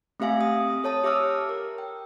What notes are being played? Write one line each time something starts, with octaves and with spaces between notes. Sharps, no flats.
A3 C4 G4 E5 F5 G#5
D#6
A4 C#5 A5 D#6
G4 E5 D6 E6 F6
A#4
G5